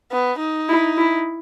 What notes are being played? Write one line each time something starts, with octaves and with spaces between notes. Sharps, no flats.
B3
D#4
E4
E4